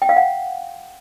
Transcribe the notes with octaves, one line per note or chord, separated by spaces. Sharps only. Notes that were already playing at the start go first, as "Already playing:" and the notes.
G5
F5
F#5